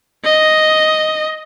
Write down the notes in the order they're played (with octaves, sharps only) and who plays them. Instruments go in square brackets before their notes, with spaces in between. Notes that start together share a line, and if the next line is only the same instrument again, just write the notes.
[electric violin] D#5